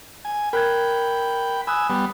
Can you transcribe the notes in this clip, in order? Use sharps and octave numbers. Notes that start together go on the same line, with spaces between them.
G#5
A#4 G5 B5 F#6 G#6
G#5 B5 D#6 E6 F#6
G3 B3